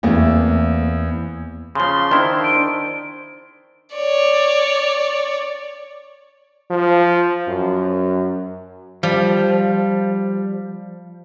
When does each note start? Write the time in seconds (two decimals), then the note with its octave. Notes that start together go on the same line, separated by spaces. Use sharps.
0.03 E2 A3 A#3 C4
1.75 C#3 F3 C6
2.11 D#3 D4 E4 C5
2.44 D7
3.95 C#5 D5
6.70 F3
7.48 F#2
9.03 F3 G3